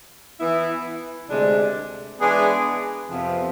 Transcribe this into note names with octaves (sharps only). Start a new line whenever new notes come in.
E3 B3 E4
D2 C3 G#3 D4
E3 G#3 B3 D4 G#4
F2 C3 F3 B3